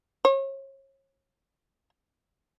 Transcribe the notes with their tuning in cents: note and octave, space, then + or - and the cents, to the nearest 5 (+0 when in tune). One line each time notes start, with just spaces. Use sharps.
C#5 -35